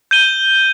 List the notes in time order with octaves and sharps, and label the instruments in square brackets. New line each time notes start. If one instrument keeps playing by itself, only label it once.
[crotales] G6 D#7 G7